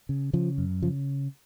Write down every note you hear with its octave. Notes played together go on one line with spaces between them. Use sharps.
C#3
C#3 F3
F#2
C#3 F3